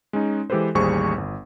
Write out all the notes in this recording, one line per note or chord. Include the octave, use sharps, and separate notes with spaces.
G#3 C#4 D#4
E3 G#3 G4 A4 B4 C5
A1 D#2 G3 G#4 C5 C#6
G1